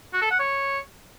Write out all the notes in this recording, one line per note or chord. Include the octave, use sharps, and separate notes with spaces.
F#4
A4
F#5
C#5